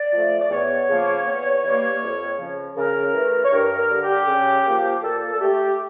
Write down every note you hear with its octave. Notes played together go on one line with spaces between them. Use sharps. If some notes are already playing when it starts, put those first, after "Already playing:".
Already playing: D5
F3 A3
D5
E2 C#5
C#3 F3 A#3
E2
E3 G3 A#3
F2
C#3 F3
C#3 A#4
E3 A3
C#5
G2 A#4
A#4
D3 G3
G4
C#3
F3 A#3
A#2 A4
A4
A3 G4